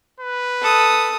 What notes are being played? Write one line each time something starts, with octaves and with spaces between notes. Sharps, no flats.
B4
A4 D#6